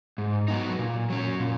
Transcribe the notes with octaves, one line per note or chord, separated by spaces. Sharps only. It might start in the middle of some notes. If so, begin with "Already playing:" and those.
G#2
F#3 B3 D#4
A#2
F#3 C#4
A#2